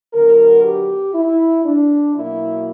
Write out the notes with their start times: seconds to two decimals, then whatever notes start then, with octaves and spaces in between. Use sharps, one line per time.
0.14 D3 F#3 B3 A#4
0.64 G4
1.14 E4
1.65 D4
2.14 B2 F#3 A#3 E4